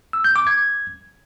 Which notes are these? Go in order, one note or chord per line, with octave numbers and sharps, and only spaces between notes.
E6
G6
D6
G#6